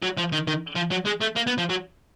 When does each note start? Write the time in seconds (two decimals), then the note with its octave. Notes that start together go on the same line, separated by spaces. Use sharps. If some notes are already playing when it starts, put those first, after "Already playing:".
0.02 F#3
0.17 F3
0.32 D#3
0.47 D#3
0.76 F3
0.92 F#3
1.06 G#3
1.21 A3
1.36 A#3
1.47 B3
1.58 F3
1.70 F#3